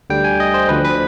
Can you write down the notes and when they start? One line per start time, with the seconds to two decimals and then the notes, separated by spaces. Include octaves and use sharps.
0.10 D2 D3 G3 G5
0.24 G#5
0.40 D#5
0.54 C5
0.69 D2 D3 F3 B4
0.85 B4